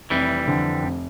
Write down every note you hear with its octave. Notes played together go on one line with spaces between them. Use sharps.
F1 E3 G3
F2 D3
F1